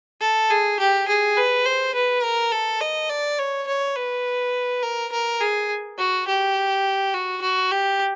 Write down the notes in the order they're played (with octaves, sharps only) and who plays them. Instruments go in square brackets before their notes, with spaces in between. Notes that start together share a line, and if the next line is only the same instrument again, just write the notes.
[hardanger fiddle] A4
G#4
G4
G#4
B4
C5
B4
A#4
A4
D#5
D5
C#5
C#5
B4
A#4
A#4
G#4
F#4
G4
F#4
F#4
G4